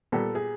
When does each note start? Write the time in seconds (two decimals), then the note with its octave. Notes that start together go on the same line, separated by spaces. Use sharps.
0.12 A#2 G3 B3 A4
0.35 G#4